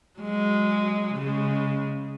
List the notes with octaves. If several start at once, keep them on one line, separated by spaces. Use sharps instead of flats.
F#3 G#3
C#3 G#3